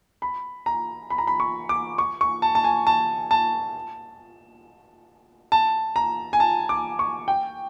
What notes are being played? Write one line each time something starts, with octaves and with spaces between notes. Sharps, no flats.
B5
A#5
B5
A#5
B5
C#6
D6
C#6
C#6
A5
A5
G#5
A5
A5
A5
A#5
G#5
A5
D6
C#6
G5